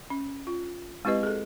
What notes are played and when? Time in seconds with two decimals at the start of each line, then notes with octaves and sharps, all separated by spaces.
0.10 C#4
0.47 F4
1.05 G#3 C4 E4 G4 B4 D#5
1.23 G#4 A4